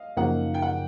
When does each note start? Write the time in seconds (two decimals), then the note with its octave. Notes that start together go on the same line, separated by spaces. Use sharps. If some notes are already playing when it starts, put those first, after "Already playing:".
Already playing: D#5 F5
0.17 F#2 C#3 F3 A#3 D#4 F#5
0.54 G5
0.62 F#5